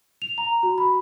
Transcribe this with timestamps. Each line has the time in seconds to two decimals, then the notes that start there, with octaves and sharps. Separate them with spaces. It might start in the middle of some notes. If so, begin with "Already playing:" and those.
0.22 F7
0.38 A#5
0.63 F#4
0.78 B5